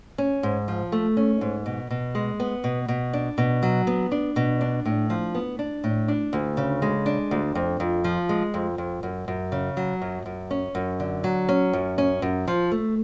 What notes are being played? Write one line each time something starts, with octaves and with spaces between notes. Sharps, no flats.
C#4
G#2
F3
A3
C#4
G#2
B2
B2
G#3
B3
B2
B2
D4
B2
F#3
B3
D4
B2
D4
A2
F3
B3
D4
A2
D4
D2
C#3
G#3
D4
D2
F2
F2
F3
G#3
F2
F2
F#2
F#2
C#3
F#3
F#2
F#2
C#4
F#2
D3
F#3
C#4
F#2
C#4
F#2
F3
A3